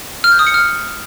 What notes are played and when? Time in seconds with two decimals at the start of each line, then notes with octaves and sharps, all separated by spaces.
0.24 F6
0.32 G6
0.39 D#6
0.47 C#7
0.54 F6